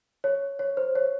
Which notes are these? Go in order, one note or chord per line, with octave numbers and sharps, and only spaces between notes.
C#5
C#5
C5
C#5